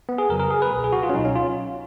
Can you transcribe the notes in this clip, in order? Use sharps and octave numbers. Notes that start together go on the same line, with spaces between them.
B3
G#4
F2 C#3 F#3 A#4
A#4
G#4
B4
C#2 B2 F#3
G#4
F#4
F4
C#4
C#2 B2 F#3 D#4
C#4
F4